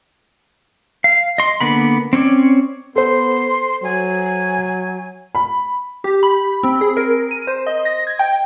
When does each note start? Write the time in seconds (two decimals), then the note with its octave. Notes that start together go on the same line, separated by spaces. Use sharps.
1.04 F5
1.38 D#5 C6
1.61 D3 A#3 B3 B5
2.13 C4 C#4 C#5 D5
2.96 B3 A4 C5 C6
3.84 F#3 G#5
5.35 B5
6.04 G4
6.23 B5
6.63 C4
6.81 G#4
6.97 A#4
7.31 D#7
7.47 C5
7.67 D#5
7.85 A#6
8.07 G#6
8.19 G5